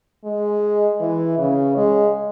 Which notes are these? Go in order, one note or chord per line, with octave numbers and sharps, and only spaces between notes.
G#3
E3
C#3
G#3